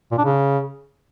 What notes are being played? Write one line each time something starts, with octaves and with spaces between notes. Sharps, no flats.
A#2
D4
C#3